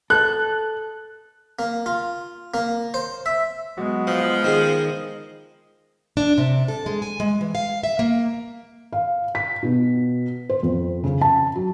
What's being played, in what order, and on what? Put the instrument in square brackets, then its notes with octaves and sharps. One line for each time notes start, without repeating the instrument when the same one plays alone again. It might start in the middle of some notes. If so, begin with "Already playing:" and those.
[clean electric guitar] A4 [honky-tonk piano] F#6
[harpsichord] A#3
F4
A#3
C5
E5
[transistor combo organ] F#3 F#4 [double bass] G#3 B3
[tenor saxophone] F3 [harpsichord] F#5
[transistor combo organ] D#3 D#5 [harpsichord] C4 G#4
[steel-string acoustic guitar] D4
C3
A4
G#3
G#5
G#3
E3
F5
E5
A#3
[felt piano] F5
B6
B2
C5
F2
C#3
A5
F#3